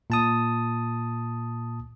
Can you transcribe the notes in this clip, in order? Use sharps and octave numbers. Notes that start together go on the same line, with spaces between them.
A#2 A5 D#6